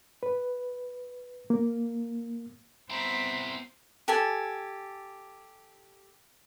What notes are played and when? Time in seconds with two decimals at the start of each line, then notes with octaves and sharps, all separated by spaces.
0.23 B4
1.50 A#3
2.90 B3 C4 E4 C5 A#5 B6
4.08 G4 A4 G#5